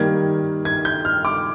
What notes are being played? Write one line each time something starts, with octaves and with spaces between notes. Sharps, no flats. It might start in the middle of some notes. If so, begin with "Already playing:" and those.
Already playing: D#3 G3 A#3 G#6
G#6
G6
F6
D6